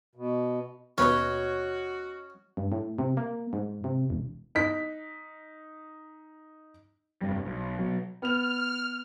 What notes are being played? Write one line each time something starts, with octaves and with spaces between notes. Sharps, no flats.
B2
D#2 B2 C#4 F#4 B4 C#5 D#5
G2
A2
C3
A#3
G#2
C3
E1
D#4 B6
F1 G2 G3
B1
B2 F#3
B3 F6 F7